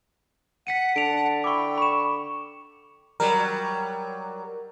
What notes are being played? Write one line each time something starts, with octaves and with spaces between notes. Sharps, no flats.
F#5 B6 C#7 D#7
D3 A5 D7 F7
E4 G5 C#6 D6
B5 C#6 E7
F#3 G3 A#4